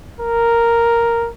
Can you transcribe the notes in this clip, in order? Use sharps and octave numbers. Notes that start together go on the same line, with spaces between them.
A#4